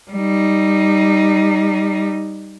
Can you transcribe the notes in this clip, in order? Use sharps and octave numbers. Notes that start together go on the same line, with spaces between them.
G3 D#4